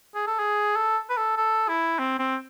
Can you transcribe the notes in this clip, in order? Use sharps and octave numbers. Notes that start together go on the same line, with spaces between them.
G#4
A4
G#4
A4
B4
A4
A4
E4
C4
C4